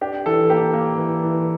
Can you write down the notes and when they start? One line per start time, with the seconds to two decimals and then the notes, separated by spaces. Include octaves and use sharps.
0.01 D4 G4
0.26 E3 A4
0.50 A#3 G4
0.73 A#3
0.98 E3
1.23 E3